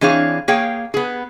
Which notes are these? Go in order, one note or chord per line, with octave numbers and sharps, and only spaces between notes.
E3 C4 D4 G#4 C#5 F5
A#3 G#4 C#5 F5 G5
B3 G#4